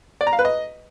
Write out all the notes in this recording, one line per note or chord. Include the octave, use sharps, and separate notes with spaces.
D5
A#5
F5
B4
D#5